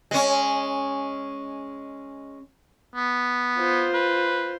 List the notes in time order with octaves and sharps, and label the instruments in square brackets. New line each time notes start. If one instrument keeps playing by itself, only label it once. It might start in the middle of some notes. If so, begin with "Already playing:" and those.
[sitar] G#3 C#4
[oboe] B3
[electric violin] F4 C5
[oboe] B4